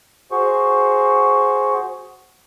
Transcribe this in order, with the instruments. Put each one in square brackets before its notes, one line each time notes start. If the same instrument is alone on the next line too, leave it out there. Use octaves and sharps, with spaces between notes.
[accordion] F#4 G#4 C5 C#6